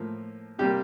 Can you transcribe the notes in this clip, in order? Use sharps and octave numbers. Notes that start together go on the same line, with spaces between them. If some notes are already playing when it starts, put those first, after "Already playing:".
Already playing: A2 F3 A#3
C3 G3 A#3 G4